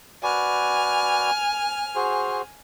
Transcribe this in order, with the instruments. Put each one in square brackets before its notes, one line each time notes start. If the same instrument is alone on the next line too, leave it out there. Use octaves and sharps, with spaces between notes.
[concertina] F#4 B4 D5 [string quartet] G#5 F6
[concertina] F#4 G#4 C5